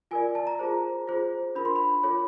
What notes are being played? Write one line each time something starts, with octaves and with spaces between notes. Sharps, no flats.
F4 A#4 D5 G#5
A5
A#5
F4 G#4 C5
F4 G#4 C5
D4 F4 A#4 B5
C6
B5
F4 A4 C#5